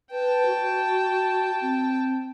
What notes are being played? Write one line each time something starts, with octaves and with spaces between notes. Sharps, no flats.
B4 G5 A5
F#4
C4